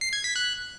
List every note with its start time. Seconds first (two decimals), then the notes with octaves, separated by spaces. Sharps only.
0.01 C7
0.13 G#6
0.24 B6
0.36 F#6